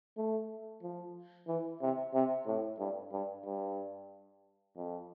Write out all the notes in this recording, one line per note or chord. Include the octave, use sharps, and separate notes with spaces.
A3
F3
E3
C3
C3
A2
G2
G2
G2
F2